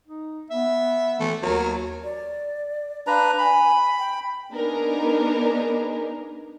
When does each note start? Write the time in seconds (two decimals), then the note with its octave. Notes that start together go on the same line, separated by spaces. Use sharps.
0.08 D#4
0.50 B3 E5
1.20 E3 A3
1.43 D#2 F#3 A#4
2.03 D5
3.07 D4 B4 F5 A#5
3.38 G#5 B5
3.99 G5
4.53 B3 D4 D#4 G#4 A#4 B4